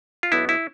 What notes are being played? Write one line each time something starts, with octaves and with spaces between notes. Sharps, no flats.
F4
B1 B2 B3 D4 E4
E4